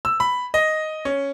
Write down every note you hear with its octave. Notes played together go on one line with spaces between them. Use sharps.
E6
B5
D#5
C#4